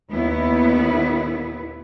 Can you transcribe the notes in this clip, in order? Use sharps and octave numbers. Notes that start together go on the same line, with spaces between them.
D#2 A#2 B3 E4 B4